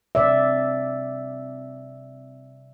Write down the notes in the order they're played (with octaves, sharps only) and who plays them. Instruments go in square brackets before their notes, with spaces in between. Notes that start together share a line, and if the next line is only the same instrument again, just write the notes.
[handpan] C3 D5 E5